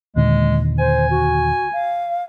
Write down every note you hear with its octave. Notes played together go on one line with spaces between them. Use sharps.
D#2 A#2 D3 G#3
C5 G#5
F#4
F5